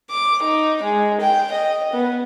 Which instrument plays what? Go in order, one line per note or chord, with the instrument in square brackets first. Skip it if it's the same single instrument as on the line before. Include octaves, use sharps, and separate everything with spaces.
[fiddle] D6
D#4
G#3
G5
D#5
B3